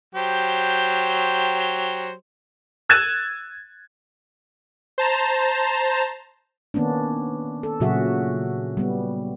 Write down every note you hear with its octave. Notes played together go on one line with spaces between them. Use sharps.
F#3 G4 C5
E6 F#6 G#6 A6 D#7 E7
C5 A5 A#5
D#3 A#3 B3 C#4 D4
A4
A#2 C#3 F#3 F#4 G#4 E5
G3 B3